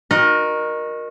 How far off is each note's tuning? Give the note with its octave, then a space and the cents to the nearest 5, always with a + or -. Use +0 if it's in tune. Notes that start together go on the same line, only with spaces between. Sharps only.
F#4 -25 A#4 +15 D#5 -25